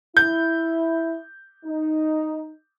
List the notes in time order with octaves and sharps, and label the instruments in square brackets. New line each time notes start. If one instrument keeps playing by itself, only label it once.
[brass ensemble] E4 [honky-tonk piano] G6
[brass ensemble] D#4